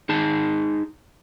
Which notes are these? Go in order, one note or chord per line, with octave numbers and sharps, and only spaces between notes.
D#4 G#4 A5